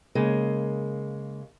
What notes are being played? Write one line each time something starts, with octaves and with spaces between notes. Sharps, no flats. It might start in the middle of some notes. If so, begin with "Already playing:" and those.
C#3 G#3 A#3